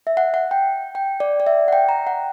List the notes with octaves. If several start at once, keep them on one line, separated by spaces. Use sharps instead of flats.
E5
F#5
F#5
G5
G5
D5
D5
E5
F#5
G5
A#5
F#5